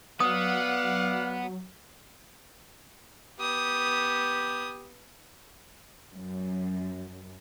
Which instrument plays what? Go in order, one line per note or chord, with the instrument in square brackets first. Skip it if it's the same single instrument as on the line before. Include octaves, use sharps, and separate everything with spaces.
[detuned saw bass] F#3 [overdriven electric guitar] B3 [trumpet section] D5 F5 F#5 [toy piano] D#6
[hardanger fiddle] B3 D#6 [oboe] G4
[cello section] F#2